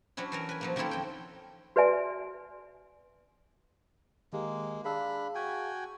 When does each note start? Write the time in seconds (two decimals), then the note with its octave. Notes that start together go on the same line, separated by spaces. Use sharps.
0.17 F#3 C#4 D4 E4
0.32 E3 F#3 A#4
0.49 B4 G#5
0.61 F3 F#3 A#3
0.76 D#3 A#3 C4 C#4 E4 A4
0.91 F2 G5
1.76 F#4 B4 D5 E5 G#5
4.33 D#3 G#3 A#3 G4
4.85 D4 G#4 F5 B5 E6
5.35 F#4 G5 G#5